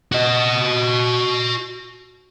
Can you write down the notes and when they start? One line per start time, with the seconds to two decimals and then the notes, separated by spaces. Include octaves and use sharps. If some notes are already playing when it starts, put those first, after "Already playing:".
0.12 F#4 D#5